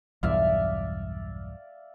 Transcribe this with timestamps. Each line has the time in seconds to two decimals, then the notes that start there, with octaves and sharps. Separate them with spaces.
0.23 B1 E2 G2 D5 E5 F5